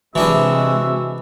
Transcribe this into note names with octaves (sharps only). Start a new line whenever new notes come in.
C3 E3 G#3 D4 F#4 D#5 E5